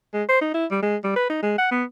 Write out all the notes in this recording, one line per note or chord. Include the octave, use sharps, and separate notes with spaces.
G#3
C5
D#4
E4
G3
G#3
G3
B4
D#4
G#3
F#5
B3